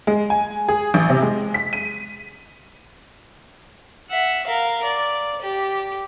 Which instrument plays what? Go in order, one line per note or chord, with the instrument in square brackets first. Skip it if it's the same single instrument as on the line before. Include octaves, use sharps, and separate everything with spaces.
[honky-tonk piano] G#3
G#5
G#4
A1
C3
G#3
B6
D#7
[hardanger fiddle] E5 F#5
A#4 F5
D5
G4